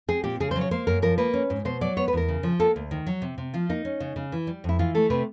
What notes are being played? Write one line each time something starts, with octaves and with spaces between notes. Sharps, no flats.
C4 G#4
A#2 G4
C#3 G#4
C5
F#3
C#5
A#3 C5
F#2 A#4
F3 A#4
A#3 B4
C#4
G#2
B2 C5
F#3 D5
B3 C#5
B4
E2 A#4
C#3
F3
A#3 A4
D2
D#3
F#3
C3
C3
F3 F4
A#3 D#4
C#4
C#3
C#3
E3
G3
F2 E4
E3 F4
A3 A4
C3 B4